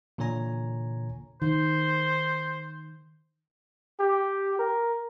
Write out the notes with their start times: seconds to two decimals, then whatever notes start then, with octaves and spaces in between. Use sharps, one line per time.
0.18 A#2 D3 E3 C#5 G#5 A#5
1.42 D#3 C5
4.00 G4
4.59 A#4